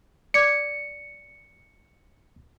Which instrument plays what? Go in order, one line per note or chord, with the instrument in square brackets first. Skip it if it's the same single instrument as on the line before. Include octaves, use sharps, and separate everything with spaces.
[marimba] D5 D6 G#6 [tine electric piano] C#7